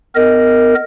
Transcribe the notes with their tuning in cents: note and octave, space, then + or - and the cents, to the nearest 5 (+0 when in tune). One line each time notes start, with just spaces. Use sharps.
B3 +30 A#4 -10 D#5 +0